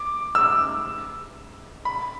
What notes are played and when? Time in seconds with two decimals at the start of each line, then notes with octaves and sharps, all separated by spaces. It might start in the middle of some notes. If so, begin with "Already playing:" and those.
Already playing: D6
0.35 E6
1.85 B5